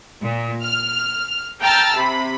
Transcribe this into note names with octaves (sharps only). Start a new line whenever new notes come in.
A#2
F6
G5 A5 A#5 E6 F6 A6
C3 B5